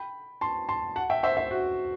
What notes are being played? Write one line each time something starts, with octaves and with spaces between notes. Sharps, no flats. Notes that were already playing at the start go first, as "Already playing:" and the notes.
Already playing: G5 B5
A5 C6
A5 C6
F#5 A5
E5 G5
C5 E5
C5 E5
F#4